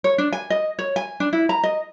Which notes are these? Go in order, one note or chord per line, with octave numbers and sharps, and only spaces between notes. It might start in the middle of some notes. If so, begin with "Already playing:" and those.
C#5
D4
G#5
D#5
C#5
G#5
D4
E4
A#5
D#5